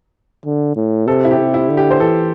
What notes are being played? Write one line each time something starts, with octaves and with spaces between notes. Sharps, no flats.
D3
A2
C3 A4
E4
G4
C3
E4
D3
G4
C5
E3 A4